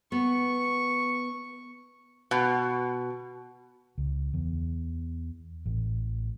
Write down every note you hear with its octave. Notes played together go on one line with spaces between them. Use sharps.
B3 C#6
B2
C#2
E2
A1